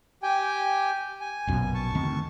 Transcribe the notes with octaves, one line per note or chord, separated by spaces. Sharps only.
G4 G5 G#5
G#5
A#1 F#2 B2
A5 C#6
D2 D#3 C4